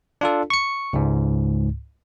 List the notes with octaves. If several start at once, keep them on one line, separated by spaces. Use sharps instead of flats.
D4 F4 A4
C#6 C#7
C#2 G#2